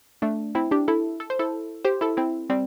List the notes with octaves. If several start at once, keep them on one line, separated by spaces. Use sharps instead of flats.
A3 D4
C4 E4
D4 G4
E4 A4
A4
C5
E4 A4
G4 C5
E4 A4
C4 E4
G3 C4